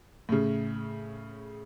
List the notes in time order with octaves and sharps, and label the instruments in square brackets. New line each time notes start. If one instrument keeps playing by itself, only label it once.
[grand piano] A2 C#3